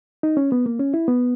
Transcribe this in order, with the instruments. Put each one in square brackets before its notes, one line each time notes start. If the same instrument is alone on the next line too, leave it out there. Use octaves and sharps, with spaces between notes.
[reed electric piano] D#4
C#4
B3
A#3
C#4
E4
B3